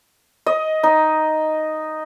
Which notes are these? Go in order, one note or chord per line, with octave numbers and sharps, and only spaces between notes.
D#5
D#4